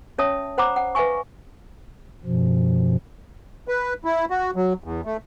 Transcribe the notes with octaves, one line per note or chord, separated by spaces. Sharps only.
C#4 C#5 E5 A5 D#6
C5 F#5 A#5 B5 D6
F#5
B4 E5 F5 G#5 C#6
F#2 B2 F3
B4
E4
F#4
F#3
E2
A3